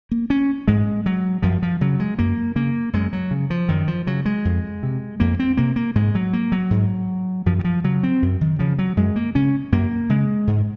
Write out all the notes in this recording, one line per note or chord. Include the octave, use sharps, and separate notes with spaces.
A#3
C#4
G#2 G#3
F#3
F#2 F3
F3
C#3 F#3
G#3
F#2 A#3
C#3 A#3
F#2 G#3
F#3
C#3
F3
F#2 D#3
F3
C#3 F#3
G#3
F2
C3
F2 A#3
C4
C3 A#3
A#3
G#2 G#3
F#3
A#3
F#3
G#2
F#2 F3
D#3
F3
C#3 F#3
C4
F#2
D#3
C#3 F3
F#3
F#2 G#3
A#3
C#3 C#4
F#2 A#3
C#3 G#3
G#2